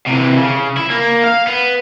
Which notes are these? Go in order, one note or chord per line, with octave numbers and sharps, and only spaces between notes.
C3 E3
C#3
E4
A#3
F5
B3